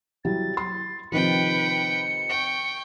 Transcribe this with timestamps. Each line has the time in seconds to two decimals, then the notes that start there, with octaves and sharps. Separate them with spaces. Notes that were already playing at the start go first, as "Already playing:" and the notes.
0.25 F#3 G3 E4 A6
0.57 C6
1.12 C3 D#3 F3 B4 G5 C#7
2.30 G5 C#6